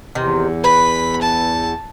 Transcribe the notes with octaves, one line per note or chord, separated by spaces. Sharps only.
E2 C3 D#3
B4 B5
A5